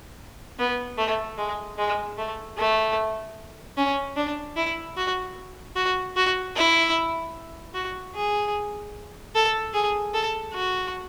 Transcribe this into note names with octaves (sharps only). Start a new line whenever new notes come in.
B3
A3
G#3
G#3
A3
A3
C#4
D4
E4
F#4
F#4
F#4
E4
F#4
G#4
A4
G#4
A4
F#4